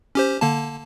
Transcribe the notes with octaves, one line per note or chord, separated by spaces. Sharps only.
C#4 G4 C5
D3 A#3 A5